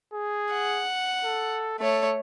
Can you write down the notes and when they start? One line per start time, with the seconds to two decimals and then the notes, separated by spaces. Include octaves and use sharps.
0.13 G#4
0.52 F#5
1.24 A4
1.79 A3 A4 C#5